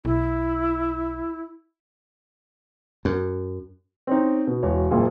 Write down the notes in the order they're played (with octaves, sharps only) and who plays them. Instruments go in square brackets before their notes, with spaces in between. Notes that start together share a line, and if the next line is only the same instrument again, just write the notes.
[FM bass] B1 [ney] E4
[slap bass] F#2
[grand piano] C4 C#4 D#4
B2
E1 C#5
F#1 A#2 G#4